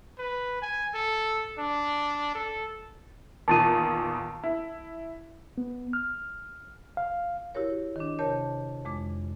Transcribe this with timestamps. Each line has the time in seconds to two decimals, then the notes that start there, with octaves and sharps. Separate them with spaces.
0.18 B4
0.62 G#5
0.94 A4
1.58 D4
2.35 A4
3.48 E2 A#2 D#3 A5 A6 D#7
4.43 E4
5.58 B3
5.93 F6
6.97 F5
7.55 E4 F#4 G4 A#4 C#5
7.96 D#3 D4
8.19 C3 A#4 C#5 A5 G6
8.85 F2 G#3 D6